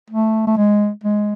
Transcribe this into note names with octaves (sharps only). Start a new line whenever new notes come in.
A3
A3
G#3
G#3